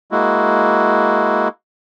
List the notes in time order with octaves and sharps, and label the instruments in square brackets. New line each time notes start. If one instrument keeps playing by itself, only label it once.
[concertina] G#3 A#3 E4 F#4